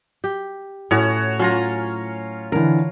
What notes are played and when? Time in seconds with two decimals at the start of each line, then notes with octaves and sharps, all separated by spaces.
0.24 G4
0.91 A2 C#4 F#4 C#5
1.39 F#3 C#4 F4 A#5
2.52 D3 E3 A#4